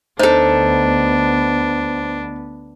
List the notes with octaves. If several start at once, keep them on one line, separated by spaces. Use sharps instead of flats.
D2 B3 D4 D#4 A4 C5